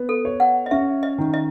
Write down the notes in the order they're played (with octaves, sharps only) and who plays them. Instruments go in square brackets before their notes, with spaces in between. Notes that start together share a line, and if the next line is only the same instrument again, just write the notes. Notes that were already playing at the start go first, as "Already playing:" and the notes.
Already playing: [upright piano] B3
[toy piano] A4
[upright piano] C#5
[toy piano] F#5
D#5
[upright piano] C#4 [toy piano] E5
[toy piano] D#5
[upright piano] D#3
[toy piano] D#5